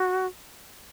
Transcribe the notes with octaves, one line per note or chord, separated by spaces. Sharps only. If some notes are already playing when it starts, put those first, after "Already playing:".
Already playing: F#4